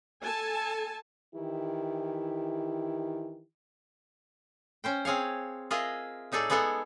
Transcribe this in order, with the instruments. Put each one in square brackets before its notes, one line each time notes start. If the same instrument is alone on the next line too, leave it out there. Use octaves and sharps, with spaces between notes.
[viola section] A4 G#5 A5
[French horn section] D#3 E3 E4 G4
[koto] C#4 C5 G5
C4 G#4 C#5 F5
F4 G#4 A#4 D#5 E5
A2 D#4 G#4 A4 D5
G#3 B3 G#4 A4 F#5 G#5